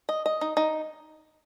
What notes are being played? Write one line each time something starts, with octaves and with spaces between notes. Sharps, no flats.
D#5
D#5
D#4
D#4